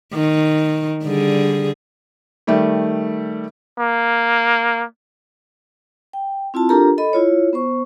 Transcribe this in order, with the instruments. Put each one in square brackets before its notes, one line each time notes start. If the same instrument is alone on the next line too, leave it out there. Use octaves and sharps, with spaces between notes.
[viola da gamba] D#3
D3 G3 G#4
[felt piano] D#3 G3 A3
[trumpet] A#3
[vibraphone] G5
C4 E4 F4 A5
D4 F4 G4 A4 A#4 A#5
A4 D#5 B5
E4 F4 C#5
B3 C5 C#6